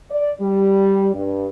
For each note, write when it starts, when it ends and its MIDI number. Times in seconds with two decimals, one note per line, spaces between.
0.10 0.31 74
0.41 1.09 55
1.14 1.47 43